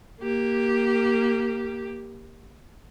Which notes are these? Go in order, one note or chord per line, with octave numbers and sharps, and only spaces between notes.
A#3 G4